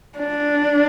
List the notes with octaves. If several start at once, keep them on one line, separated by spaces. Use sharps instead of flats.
D4